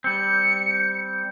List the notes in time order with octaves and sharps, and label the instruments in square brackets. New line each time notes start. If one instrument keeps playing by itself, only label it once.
[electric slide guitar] G3 C4 [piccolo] C#7